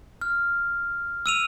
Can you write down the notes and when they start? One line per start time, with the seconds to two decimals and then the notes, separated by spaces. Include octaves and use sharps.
0.21 F6
1.26 E6 D#7 F7